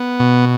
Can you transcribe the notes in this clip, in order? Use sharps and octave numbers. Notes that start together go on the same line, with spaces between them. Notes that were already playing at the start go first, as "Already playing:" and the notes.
Already playing: B3
B2